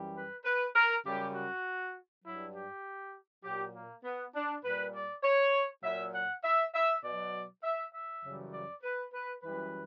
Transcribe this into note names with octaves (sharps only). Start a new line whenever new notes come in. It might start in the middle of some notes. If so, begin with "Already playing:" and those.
Already playing: F#2 E3 G3
B4
B4
A#4
F#2 C#3 G3 G4
F#4
G2 F#3 E4
G4
A#2 F#3 G4
A#3
B3
D4
A#2 G3 B4
D5
C#5
A#2 F#3 E5
F#5
E5
E5
B2 F#3 D5
E5
E5
F#2 C#3 E3 G3
D5
B4
B4
F#2 E3 G3 B4